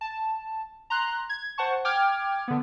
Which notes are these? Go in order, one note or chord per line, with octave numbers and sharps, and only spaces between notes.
A5
A#5 C6 F#6
G#6
C5 F#5 A5 C#6
G5 D6 F6 G#6
D3 B3